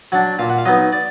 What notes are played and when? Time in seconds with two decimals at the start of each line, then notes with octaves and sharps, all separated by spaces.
0.12 F#3 D4 F#5
0.39 A#2 F5
0.50 F#5
0.58 F5
0.66 F#3 B3 D#4 D#5
0.92 D5